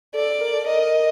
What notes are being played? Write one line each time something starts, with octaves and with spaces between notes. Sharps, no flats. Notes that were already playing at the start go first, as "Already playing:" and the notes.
A4 D5
A#4
A4
A#4 D#5